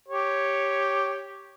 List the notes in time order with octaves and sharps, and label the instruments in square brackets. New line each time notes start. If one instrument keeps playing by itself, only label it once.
[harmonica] G4 C#5